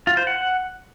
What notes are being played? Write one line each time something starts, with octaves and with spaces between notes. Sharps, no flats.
F4
C5
F#5